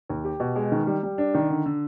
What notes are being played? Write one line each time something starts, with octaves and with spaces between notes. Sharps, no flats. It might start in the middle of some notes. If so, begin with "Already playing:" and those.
D#2
G4
B2
G#3
D#3
G3
G3
D4
D#3
D3
D3